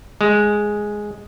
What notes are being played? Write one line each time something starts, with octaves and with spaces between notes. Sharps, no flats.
G#3